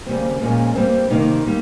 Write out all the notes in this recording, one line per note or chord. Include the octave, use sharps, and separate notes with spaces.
D#2 C#3 G3 A#3 C4
A#2 F3 G#3 A#3 C#4
G2 G3 A#3 C4
C3 D#3 A#3 C4 D#4
G3 A#3